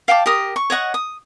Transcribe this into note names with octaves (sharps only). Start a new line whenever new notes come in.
F5 G5 A5 D6
G4 A#4 D#6
C#6
C#5 D#5 F#5 C#6
D#6